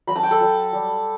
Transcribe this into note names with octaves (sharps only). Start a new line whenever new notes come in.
F#3 B5
A5
G5
A4 A5
F#3
G3